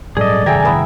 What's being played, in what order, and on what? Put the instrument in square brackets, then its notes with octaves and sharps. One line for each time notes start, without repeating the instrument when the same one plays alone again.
[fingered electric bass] A2 F#3 G3 [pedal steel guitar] G#4 D#5 [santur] A4 [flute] D5
[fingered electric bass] G2 C3 D#3 [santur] G#4 E5 G5 [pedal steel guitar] G#5 A#5
[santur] B3 E4 E5